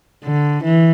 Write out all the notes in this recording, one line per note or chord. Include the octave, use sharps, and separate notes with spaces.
D3
E3